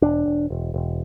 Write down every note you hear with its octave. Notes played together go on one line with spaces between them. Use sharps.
E1 D4
E1
E1
E1